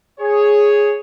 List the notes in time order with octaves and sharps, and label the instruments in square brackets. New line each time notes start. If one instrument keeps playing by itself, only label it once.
[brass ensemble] G#4 C#5